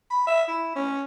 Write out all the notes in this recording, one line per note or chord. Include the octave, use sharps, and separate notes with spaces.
B5
E5
E4
C#4